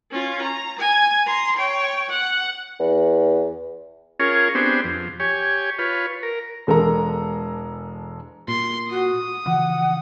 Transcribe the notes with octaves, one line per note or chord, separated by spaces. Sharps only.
C#4 F4
A#5
G#5
A#5 C6
C#5 G5
F#5
E2
C#4 F4 G#4 A#4 C#5
B3 C4 D4 G4 G#4 C5
F2
G4 C#5 G#5
F4 B4 C#5
A#4
E1 G#3 A4 A#4 A#5
A#2 C6
F#4 D#6
C#3 E3 F3 F#5